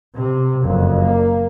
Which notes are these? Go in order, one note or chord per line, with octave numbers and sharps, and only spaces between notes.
C3
F#1 F2
A#3